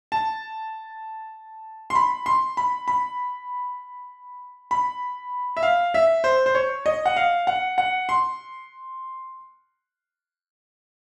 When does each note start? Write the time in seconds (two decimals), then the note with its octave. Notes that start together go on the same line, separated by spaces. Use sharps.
0.12 A5
1.90 C6
1.95 B5
2.26 C6
2.57 B5
2.88 B5
4.71 B5
5.57 E5
5.63 F5
5.94 E5
6.24 C5
6.46 C5
6.55 C#5
6.86 D#5
7.06 F#5
7.16 F5
7.47 F#5
7.78 F#5
8.09 C6